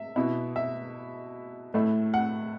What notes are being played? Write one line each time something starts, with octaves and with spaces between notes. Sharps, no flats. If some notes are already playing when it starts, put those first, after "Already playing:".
Already playing: E5
B2 B3 E4
E5
A2 A3 E4
F#5